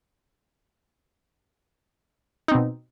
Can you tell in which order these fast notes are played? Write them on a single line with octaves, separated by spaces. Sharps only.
D#4 C4 B2